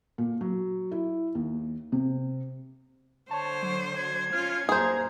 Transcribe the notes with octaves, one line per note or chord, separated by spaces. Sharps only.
A#2
F#3
E4
D#2
C3
D3 C5 C#5 A5
F#3
G#6
C#4 F4 F6
F#2 A#2 G#4 C5 A#5